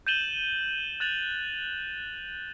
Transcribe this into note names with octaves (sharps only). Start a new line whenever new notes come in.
G6 A6 D#7 E7 F#7 G7
F#6 A6 F7 F#7